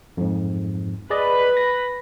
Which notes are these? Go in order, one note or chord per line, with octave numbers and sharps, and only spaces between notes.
F2 G#2
G#4 B4 D5 D#5 B5
A#6